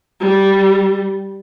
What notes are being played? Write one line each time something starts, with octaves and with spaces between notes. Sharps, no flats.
G3